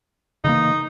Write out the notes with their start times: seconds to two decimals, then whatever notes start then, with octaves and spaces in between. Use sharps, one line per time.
0.44 C#3 E3 A#3 D#4